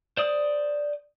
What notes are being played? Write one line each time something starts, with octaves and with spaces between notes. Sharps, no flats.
C5 D5 D#6